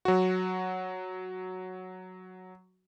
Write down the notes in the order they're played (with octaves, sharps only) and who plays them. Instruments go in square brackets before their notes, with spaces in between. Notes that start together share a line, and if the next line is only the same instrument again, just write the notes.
[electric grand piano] F#3 F#4